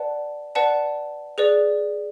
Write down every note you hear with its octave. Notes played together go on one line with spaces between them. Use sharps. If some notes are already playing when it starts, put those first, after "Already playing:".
Already playing: B4 D5 F#5 A5
B4 D5 F#5 A5
G#4 B4 D5